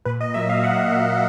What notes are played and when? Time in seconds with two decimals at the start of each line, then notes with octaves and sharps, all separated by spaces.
0.05 A#2 B4
0.21 D#5
0.34 F#3 A#3 E5
0.49 F5
0.63 A#2 F#5
0.92 F#3 A#3